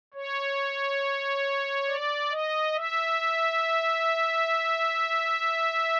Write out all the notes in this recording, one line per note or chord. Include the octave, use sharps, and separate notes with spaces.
C#5
D5
D#5
E5